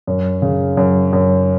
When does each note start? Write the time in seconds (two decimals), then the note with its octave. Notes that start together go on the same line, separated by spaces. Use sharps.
0.07 F#2
0.42 C#3
0.77 F#2
1.13 F#2